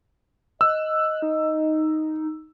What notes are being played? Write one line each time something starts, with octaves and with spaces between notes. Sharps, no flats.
D#5 E6 F#6
D#4